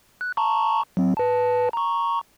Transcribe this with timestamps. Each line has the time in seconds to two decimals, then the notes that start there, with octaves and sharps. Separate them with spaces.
0.21 F#6
0.37 A5 A#5 C#6
0.97 F#3 C4
1.17 B4 A5
1.73 A#5 C#6